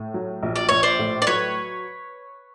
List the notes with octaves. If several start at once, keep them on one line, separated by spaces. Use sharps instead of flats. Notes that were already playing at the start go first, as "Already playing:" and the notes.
Already playing: A2
F#3
A#1
D5
A#1 C#5
C5 D5
A2
D5
F#3 B4 C#5